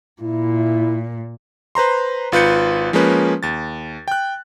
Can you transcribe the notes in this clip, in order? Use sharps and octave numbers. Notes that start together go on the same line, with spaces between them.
A#2 E4
B4 C5 A#5 C6
G#1 F4 B4 G6 C#7
F3 G#3 A#3 C#4 B4
D#2 A6
G5 F#6